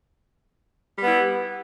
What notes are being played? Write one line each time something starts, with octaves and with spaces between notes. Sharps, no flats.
G3 B3 E4